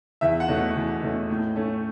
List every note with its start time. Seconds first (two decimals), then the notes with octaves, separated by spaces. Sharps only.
0.21 E2 E5
0.40 F#5
0.48 B2 A3 C#4
0.76 E2
1.02 B2 A3 C#4
1.30 A2
1.56 A3 C#4